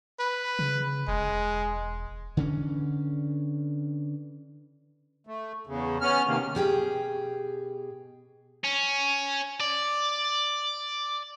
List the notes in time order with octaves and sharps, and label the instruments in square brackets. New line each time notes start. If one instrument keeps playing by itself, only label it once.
[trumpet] B4
[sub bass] C#3
[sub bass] E1 [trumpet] G#3
[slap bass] D3 E3 C#4
[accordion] A3
E2 C#3
B3 C#4 F6
C3 D#3 A#3
[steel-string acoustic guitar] B2 G4 G#4 G5
[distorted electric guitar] C#4
D5